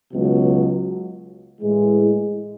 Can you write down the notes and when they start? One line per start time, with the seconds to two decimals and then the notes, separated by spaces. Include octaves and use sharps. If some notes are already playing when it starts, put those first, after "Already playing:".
0.13 C#2 B2 F#3
1.60 A2 E3 G#3